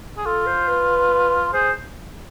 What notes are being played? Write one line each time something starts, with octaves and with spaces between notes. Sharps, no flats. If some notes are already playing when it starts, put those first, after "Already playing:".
G#4
F4 A4
C5
B4
G#4 C5